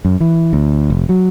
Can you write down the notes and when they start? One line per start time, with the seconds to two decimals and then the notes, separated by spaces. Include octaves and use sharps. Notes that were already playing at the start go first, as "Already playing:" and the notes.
0.05 F#2
0.20 E3
0.53 D2
0.90 F1
1.09 F#3